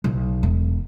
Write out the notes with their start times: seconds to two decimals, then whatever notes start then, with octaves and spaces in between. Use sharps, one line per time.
0.04 B1
0.43 E1